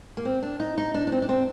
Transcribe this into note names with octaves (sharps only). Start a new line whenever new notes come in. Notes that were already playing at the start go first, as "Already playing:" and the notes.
A#3
C4
D4
D#4
D#4
D4
D4
C4
D4
C4